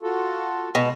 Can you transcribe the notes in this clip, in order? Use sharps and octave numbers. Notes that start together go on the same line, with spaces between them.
F4 F#4 A4
B2 G#3